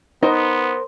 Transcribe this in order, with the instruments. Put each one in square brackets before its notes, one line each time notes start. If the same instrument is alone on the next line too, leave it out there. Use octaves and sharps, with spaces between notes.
[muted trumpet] B3 [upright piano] D#4 [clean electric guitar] A#4 C5